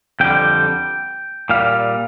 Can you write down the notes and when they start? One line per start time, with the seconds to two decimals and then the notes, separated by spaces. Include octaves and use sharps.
0.20 F2 D3 G3 G5
1.49 A#2 G3 F5